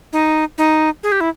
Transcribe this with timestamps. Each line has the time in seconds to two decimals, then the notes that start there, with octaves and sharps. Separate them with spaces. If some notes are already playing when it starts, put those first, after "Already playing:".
0.13 D#4
0.58 D#4
1.03 G#4
1.12 G4
1.21 E4